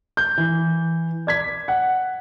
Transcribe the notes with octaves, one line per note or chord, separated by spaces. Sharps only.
G6
E3
D5 G#6 B6
F#5